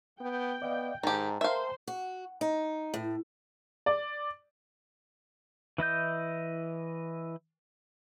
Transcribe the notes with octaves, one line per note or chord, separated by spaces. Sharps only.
B3 G5
B3 D5 D#5 F5
G#2 D#3 G4 G5 A5 A#5
A#4 C5 E5 F5 C6
F#4
D#4
A2
D5
E3 E4 D#5 G6